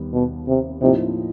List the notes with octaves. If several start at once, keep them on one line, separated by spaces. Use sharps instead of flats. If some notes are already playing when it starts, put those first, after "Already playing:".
Already playing: D#2 D#3 G3 B3
B2
C3
A2 C3 F3 A#3 D#4